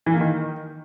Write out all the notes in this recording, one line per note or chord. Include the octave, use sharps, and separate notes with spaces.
E3
A#3
D#3